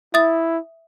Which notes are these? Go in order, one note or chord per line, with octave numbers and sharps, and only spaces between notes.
E4 E5 D#6 A6